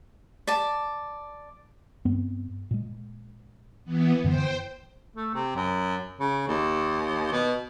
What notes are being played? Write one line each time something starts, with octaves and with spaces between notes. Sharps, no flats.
D5 A5
G2 B3 C4
A#2 G#3
E3 B3
F#2 D3 E3 C5 G5
A3
C3
F#2
C#3
D#2
B2